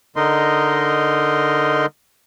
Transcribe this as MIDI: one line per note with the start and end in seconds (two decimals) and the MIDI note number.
0.16 1.86 50
0.16 1.86 63
0.16 1.86 70
0.16 1.86 75
0.16 1.86 84